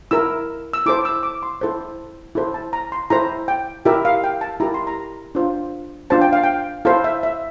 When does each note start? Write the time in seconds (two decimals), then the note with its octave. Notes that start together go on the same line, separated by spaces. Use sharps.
0.11 E4 A#4 E6
0.73 E6
0.86 E4 A4 C5 D6
1.05 E6
1.23 D6
1.43 C6
1.61 E4 A4 C5
2.35 E4 A4 C5
2.54 A5
2.73 A#5
2.92 C6
3.10 E4 A4 C5 A#5
3.48 G5
3.85 E4 G4 A#4 E5
4.05 F5
4.24 G5
4.41 A5
4.60 E4 G4 A#4 A#5
4.74 C6
4.87 A#5
5.35 D4 F4 C5
6.10 D4 F4 C5 A5
6.22 G5
6.33 F5
6.43 G5
6.85 E4 A4 C5 F5
7.04 E5
7.23 E5